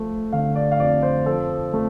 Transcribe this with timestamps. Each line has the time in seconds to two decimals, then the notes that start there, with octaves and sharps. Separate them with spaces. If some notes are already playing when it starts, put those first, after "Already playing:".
Already playing: F3 A3
0.32 D3 F5
0.55 D5
0.72 F5
0.80 F2 D5
1.03 C5
1.26 F3 A4
1.73 A3